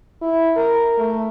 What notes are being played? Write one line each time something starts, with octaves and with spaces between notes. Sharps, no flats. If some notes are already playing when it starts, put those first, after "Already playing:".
E4
A#4
A3